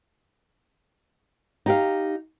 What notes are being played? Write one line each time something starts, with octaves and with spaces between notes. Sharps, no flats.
D#4 G4 F5